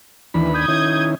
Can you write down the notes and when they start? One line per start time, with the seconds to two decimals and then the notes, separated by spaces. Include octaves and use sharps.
0.34 D#2 E3 D4 B5
0.54 D#6 G6 G#6
0.68 D#3 C#4 E4